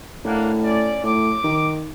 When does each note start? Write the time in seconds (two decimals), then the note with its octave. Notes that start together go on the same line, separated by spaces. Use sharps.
0.25 A2 A#3 D4 F#5
0.61 C#4 D5
1.03 A2 D6
1.44 D#3